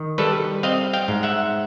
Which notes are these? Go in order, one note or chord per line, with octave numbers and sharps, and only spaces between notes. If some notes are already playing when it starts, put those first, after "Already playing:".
Already playing: D#3
G3 A4 B4
C4 D#5 F5
F5 G5
G#2
E5 F#5